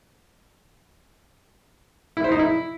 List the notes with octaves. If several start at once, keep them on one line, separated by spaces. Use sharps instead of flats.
E4
C5
D#4
E4